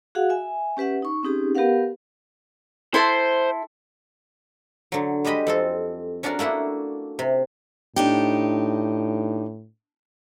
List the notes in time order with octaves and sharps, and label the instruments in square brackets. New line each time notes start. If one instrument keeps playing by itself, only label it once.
[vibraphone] F#4 G#4 F5 F#5
E5 G#5
C#4 G4 B4 E5 F#5
D#4 C#6
C4 C#4 D#4 G4 G#4
B3 G4 A#4 B4 F5 F#5
[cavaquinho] E4 A4 C6 [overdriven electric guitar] C5
[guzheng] D3 F#3
G3 G#3 G4 D#5 B5
F2 C4 A4
C#4 D4 F#4 A#4 D5
A3 A#3 D4 E4 F#5
C3
[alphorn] A2 [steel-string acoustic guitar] D4 D#4 G4